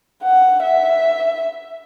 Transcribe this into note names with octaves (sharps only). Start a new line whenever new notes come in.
F#5
E5